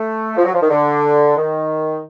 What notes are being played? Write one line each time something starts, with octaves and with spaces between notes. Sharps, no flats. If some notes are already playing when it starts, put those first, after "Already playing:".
Already playing: A3
F3
F#3
F3
D#3
D3
D#3